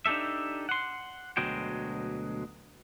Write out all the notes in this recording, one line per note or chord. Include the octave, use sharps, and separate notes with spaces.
D4 D#4 G4 A4 E5
F#5 C6
D2 B2 F#3 G#3 G5